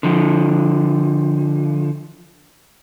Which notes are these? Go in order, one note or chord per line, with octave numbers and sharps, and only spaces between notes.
D3 F3